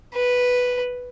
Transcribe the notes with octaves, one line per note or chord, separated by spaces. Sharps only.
B4